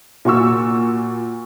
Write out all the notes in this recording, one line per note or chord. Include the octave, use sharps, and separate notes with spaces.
A#2 F#4 C#6 E6